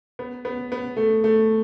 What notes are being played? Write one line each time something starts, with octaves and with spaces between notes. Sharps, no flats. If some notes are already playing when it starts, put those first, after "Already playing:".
B3
B3
B3
A3
A3